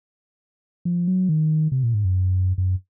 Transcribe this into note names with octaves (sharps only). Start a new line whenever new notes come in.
F3
F#3
D#3
C3
A#2
G#2
F#2
F#2